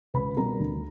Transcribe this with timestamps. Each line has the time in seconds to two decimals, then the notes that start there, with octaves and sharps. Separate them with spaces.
0.14 C#2 B4 B5
0.37 B2 G3 A#4 A#5
0.60 D2